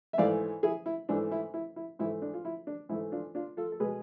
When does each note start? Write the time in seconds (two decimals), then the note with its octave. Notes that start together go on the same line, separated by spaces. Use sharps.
0.13 E5
0.18 G#2 E3 A3 D5 F5
0.63 E4 G#4
0.86 E4
1.09 G#2 E3 A3 D4
1.32 E4
1.54 E4
1.76 E4
1.99 G#2 E3 A3 E4
2.22 D4
2.34 F4
2.45 E4
2.67 D4
2.89 G#2 E3 A3 E4
3.12 D4 F4
3.35 D4 F4
3.57 F4 A4
3.72 A4
3.80 B2 G#3 G#4 B4